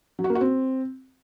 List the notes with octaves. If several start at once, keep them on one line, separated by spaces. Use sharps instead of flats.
F#3
F#4
A#3
F#4
C4